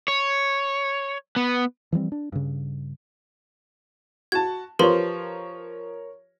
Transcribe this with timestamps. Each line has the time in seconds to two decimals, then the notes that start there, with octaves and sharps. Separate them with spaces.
0.08 C#5
1.36 B3
1.92 E3 F3 G3 C4
2.12 D4
2.32 G2 C#3
4.32 F#4 A5 G#6
4.79 F3 G4 A#4 B4 C#5 C6